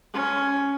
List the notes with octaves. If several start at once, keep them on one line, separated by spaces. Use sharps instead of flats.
C#4